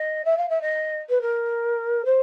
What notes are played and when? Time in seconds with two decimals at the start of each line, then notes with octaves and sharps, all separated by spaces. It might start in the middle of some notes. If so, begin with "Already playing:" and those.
Already playing: D#5
0.25 E5
0.38 F5
0.49 E5
0.62 D#5
1.10 B4
1.22 A#4
2.05 C5